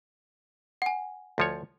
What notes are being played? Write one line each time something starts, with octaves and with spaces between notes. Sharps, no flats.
F#5 G#5
D2 F3 C#5